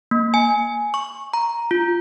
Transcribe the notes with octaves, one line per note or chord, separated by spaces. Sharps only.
A#3
G#5
C#6
A#5
F4